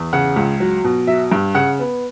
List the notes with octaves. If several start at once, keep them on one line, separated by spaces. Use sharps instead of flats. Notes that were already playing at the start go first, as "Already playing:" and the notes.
Already playing: E2
C#3 F#5
C#2
F#3
B2
F#3 E5
G2
C#3 F#5
B3